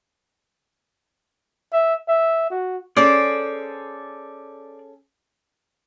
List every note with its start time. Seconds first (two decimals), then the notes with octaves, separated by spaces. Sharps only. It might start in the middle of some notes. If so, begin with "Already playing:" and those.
1.73 E5
2.08 E5
2.50 F#4
2.96 C#4 G#4 A4 C5 D5